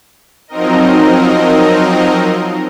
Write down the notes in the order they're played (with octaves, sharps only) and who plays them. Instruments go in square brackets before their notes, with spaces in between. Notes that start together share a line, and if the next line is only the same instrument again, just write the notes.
[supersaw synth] F3 F#3 C4 D#4 A#4 D#5